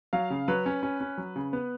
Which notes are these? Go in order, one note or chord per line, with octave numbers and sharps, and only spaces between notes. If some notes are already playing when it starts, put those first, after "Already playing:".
F#3 F5
C#3
F#3 B4
C#4
C#4
C#4
F#3
C#3
B3